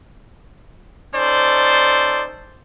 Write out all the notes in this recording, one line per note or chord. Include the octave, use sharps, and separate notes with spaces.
C#4 D#4 A4 C5 D5